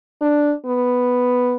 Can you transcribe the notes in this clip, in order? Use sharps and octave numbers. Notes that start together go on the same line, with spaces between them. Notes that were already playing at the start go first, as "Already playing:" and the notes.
D4
B3